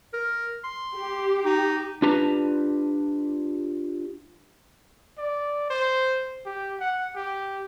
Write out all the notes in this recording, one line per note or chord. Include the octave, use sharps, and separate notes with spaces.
A#4
C6
G4
D#4
D4 F4 G4 B4 A5 A#5
D5
C5
G4
F#5
G4